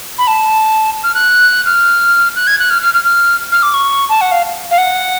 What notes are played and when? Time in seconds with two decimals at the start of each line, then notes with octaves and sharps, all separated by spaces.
0.18 B5
0.27 A5
1.04 F6
1.14 F#6
1.66 F6
2.36 F#6
2.47 G#6
2.59 F#6
2.70 F6
2.82 F6
2.94 F6
3.04 F6
3.52 F6
3.63 D6
3.74 C#6
4.09 A5
4.21 F#5
4.31 F5
4.71 F5
4.78 F#5